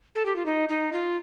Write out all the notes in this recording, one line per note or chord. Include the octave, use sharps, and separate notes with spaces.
A4
G4
F4
D#4
D#4
F4